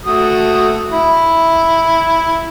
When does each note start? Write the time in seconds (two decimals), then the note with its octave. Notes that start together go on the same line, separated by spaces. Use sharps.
0.06 A3 F#4 D#6
0.90 E4